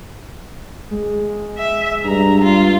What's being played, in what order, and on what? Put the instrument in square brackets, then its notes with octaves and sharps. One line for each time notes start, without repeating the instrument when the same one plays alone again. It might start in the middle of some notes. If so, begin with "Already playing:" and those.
[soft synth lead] G#3
[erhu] E5
[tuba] G2 [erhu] A#5
[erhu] F4